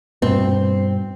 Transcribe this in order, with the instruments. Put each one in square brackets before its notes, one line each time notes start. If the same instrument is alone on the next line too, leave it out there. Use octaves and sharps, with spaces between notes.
[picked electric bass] G2 B2 [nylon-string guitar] C4